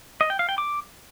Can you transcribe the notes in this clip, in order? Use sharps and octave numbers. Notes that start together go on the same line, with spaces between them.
D#5
G5
F5
G5
D6